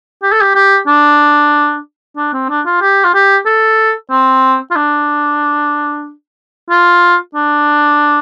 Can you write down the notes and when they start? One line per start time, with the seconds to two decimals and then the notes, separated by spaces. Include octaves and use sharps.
0.23 G4
0.32 A4
0.41 G4
0.55 G4
0.87 D4
2.17 D4
2.33 C4
2.49 D4
2.66 F4
2.81 G4
3.05 F4
3.15 G4
3.46 A4
4.11 C4
4.71 F4
4.76 D4
6.70 F4
7.35 D4